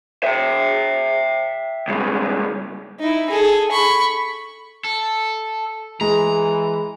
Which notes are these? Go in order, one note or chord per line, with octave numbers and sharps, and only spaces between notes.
E5 G5
C#2 G2
D#4 E4
G#4 A4
B5 C#6
A4
E3 G#3 A#5